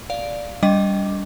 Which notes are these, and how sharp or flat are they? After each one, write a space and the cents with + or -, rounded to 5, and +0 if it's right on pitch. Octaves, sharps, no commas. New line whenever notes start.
D5 +0 F5 +0
G3 +0 D4 -45 D#5 +0